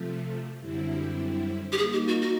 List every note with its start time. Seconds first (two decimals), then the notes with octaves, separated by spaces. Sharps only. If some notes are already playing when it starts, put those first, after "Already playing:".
Already playing: C3 F3 A3
0.60 F#2 D3 G3 C4 E4
1.72 G4
1.78 G3 A#3 D#4 G#4
1.93 G4
2.08 F#4
2.22 F#4